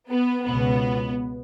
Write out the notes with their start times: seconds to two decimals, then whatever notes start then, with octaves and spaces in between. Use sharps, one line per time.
0.09 B3
0.45 C#2 B2 B3